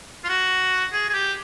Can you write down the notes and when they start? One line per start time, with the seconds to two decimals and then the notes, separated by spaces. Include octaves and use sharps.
0.24 F4
0.29 F#4
0.93 G#4
1.09 G#4
1.14 G4